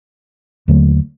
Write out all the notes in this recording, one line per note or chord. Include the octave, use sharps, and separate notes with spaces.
D#2 D3 F#3 A3